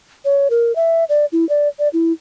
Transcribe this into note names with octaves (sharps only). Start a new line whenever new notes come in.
C#5
A#4
E5
D5
E4
D5
D5
E4